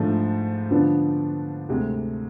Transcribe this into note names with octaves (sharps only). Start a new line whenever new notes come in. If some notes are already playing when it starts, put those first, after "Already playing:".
Already playing: G#2 F3 A3 D4
D3 F3 B3 D4
D2 C3 G#3